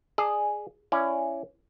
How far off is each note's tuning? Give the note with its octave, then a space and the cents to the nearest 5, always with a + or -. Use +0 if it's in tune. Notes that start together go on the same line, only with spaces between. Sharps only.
G#4 +0 D5 +30 A5 +25
C#4 +0 E4 +30 D5 +0